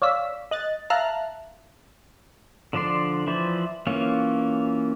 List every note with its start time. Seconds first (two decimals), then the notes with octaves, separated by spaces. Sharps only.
0.02 C#5 D5 F5 E6 B6
0.51 D#5 F#6 A6
0.90 E5 F5 A5 A#5 F6 F#6
2.73 D3 F3 D4 D5 C6
3.27 E3 F3 E4 C5 D5
3.87 E3 A#3 C#4 F4 C#5